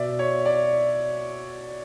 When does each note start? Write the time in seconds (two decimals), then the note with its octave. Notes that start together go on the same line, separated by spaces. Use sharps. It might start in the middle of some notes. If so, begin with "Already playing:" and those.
Already playing: B2 D5 E5
0.19 C#5
0.45 D5